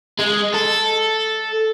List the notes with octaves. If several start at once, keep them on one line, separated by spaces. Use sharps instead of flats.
G#3
A4